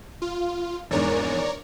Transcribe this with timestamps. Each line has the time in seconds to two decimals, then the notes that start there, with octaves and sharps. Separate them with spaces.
0.22 F4
0.91 A#1 E2 G#2 A#4 C#5 D5